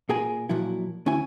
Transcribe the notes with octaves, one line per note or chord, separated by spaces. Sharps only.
A#2 G#4 A#4 G#5
A#2 F3 F#3 E4
D2 C#4 E4 G#5